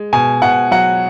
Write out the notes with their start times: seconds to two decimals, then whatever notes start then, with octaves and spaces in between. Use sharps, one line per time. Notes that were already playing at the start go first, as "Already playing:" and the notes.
Already playing: G#3
0.13 B2 G#5
0.42 B2 F#5
0.71 F#3 F#5